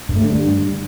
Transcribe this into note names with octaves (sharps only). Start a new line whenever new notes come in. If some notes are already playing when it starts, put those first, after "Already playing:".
G2
A3
D3
G2